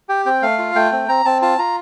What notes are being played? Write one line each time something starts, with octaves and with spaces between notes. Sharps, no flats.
G4 G5
C4 G5
A3 F5
F4
A3 G5
C4
C4 A#5
C4 A5
F4 A5
F4 A#5